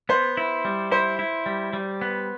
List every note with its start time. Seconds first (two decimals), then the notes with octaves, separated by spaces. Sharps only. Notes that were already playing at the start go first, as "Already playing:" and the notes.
0.09 B3 C5
0.37 E4
0.65 G3
0.91 E4 C5
1.19 E4
1.46 G3
1.73 G3
2.01 B3